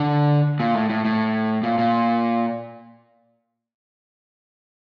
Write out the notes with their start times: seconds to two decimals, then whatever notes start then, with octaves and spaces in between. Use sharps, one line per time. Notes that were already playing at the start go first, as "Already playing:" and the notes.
Already playing: D3
0.60 A#2
0.75 A2
0.90 A2
1.05 A2
1.63 A#2
1.78 A#2